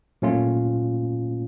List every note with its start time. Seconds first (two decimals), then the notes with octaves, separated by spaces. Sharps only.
0.22 A#2 F#3 A3 C#4 F4